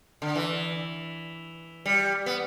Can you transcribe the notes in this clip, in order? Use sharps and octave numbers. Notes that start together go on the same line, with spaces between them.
D3
E3
G3
B3